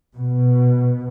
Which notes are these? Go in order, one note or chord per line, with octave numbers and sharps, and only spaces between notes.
B2